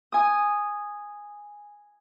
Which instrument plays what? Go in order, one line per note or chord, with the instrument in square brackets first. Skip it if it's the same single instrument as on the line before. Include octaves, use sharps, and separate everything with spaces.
[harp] G#5 D#6